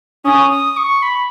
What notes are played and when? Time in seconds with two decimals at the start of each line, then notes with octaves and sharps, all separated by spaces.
0.25 C#4 D#6
0.51 D#6
0.77 C#6
1.02 B5